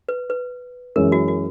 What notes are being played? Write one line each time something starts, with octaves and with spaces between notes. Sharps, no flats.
B4
B4
F#2 E3 G#3 C#4 A#4
F#4
F#4